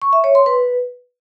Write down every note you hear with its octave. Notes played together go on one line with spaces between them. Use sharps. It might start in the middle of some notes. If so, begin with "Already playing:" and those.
C#6
E5
C#5
C6
B4